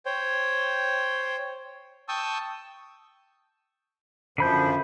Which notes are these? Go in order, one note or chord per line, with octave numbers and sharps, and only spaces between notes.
C5 C#5 G5
G5 A5 C#6 D#6 E6
F#2 D3 F3 B5 G6